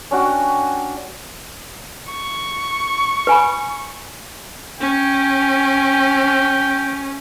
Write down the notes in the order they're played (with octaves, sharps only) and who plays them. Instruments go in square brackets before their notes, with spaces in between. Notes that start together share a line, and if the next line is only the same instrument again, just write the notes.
[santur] C#4 D4 F#4 G5
[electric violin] C#6
[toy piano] B4 G#5 B5
[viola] C#4 [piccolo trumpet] G5